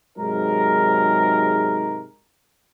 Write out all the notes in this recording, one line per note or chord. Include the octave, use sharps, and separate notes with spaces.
G#2 C3 F#3 D#4 G#4 A#4